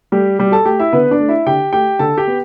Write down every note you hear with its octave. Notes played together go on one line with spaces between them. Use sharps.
G3 A3 G4
B2 G3 G4
A4 A5
A3 G4 G5
E4 E5
D3 B3 B4
D4 D5
A3
E4 E5
D3 G4 G5
A3 G4 G5
D3 A4 A5
G4 G5
B3